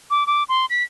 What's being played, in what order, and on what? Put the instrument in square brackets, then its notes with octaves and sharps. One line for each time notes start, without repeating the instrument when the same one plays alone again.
[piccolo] D6
D6
C6
B6